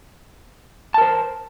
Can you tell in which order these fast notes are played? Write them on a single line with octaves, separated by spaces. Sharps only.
A5 A#4 C5